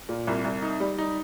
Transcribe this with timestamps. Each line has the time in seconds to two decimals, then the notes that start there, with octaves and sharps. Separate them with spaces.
0.09 A#2
0.27 C2
0.44 C2
0.62 D#4
0.80 G3
0.98 D#4